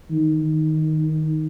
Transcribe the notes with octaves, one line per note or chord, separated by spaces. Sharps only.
D#3